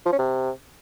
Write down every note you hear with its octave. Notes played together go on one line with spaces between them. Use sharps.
F3
C#4
C3